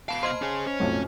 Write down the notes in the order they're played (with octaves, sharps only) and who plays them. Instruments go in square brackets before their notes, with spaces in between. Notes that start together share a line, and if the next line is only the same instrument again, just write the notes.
[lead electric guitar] B2 F5 [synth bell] A5 B5 C7
[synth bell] C5 D#5 F6 [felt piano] C6
[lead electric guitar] C#4 G#4
C#4
[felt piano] B1 F2 A2